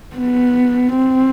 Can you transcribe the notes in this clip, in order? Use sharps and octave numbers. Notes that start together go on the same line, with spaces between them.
B3
C4